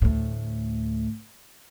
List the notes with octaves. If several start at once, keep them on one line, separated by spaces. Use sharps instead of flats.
D2 A2